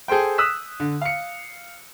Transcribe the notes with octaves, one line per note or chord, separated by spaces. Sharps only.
G#4 A4 C5 G5
D#6 E6 F#6 B6 E7
D3
F5 C#7